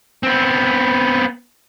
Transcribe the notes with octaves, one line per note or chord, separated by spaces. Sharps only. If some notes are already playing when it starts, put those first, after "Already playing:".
B3 C4